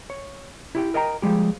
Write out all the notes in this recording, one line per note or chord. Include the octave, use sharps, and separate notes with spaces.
C#5
E4 G4 G5
A#4 D#5 G5 A#5
F3 G3 G#3 G4